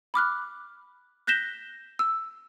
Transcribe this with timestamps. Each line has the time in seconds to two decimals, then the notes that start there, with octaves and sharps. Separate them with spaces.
0.14 B5 D6 F6 F#6
1.27 F#6 G6 A#6 B6 E7 G7
1.99 E6